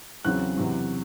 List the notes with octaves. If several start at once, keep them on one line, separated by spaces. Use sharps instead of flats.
E2 C#3 F#3 C4 F#6
E2 C3 F#3